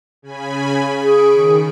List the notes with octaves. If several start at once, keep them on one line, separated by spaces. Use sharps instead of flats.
C#3 G#5 B5
G#4 C#6 D7
D#3